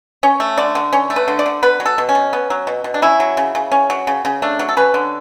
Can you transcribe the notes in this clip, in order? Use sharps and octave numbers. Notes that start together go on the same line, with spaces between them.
C#4 C#5
A3
D3 D5
D3
C#4 C#5
A3
B4
D3
D5
D3
B3 B4
F#3
A4
B2
C#4
B2
B3
F#3
B2
B2
D4
C#4 E4
F#3
C#3
C#3
C#4
F#3
C#3
C#3
A3 D4
F#3
A4
C#4 B4
D3